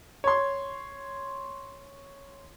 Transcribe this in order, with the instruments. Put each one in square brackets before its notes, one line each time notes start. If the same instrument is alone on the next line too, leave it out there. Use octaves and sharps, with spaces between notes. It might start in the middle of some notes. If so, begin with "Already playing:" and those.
[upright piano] C#5 C6